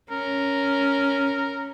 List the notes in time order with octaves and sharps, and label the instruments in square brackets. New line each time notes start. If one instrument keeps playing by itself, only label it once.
[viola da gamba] C#4 [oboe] A#4